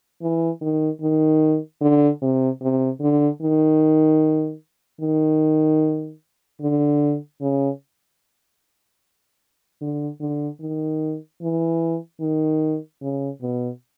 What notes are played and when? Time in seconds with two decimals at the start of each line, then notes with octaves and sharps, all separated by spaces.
0.22 E3
0.61 D#3
1.02 D#3
1.81 D3
2.22 C3
2.62 C3
3.01 D3
3.42 D#3
5.01 D#3
6.61 D3
7.41 C#3
9.81 D3
10.21 D3
10.61 D#3
11.42 E3
12.21 D#3
13.02 C#3
13.42 B2